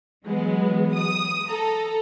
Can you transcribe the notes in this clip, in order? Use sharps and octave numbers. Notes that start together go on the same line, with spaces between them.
E3 F#3 G#3 B3
D#6
A4 A#5